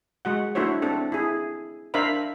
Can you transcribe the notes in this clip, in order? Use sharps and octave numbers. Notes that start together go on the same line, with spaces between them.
G#3 F#4 F#5
A3 D4 E4 F#4 C5 C#5
C4 D4 A4
E4 G#4
D4 A#4 C5 E5 F5 B5